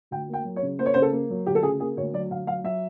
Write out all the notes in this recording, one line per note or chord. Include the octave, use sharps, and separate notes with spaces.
D2 G5
A#3
G5
F#3
C#5
C#3
A#3 C5
C#5
C#3 C5
A4
A#3
F#3
D2 G4
A4
C#3 G#4
A#3 G#4
D2 C#5
F#3 D5
D2 F5
F#3 F5
F#3 E5